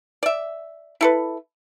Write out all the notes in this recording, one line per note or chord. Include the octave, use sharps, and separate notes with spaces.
D5 E5
E4 A4 B4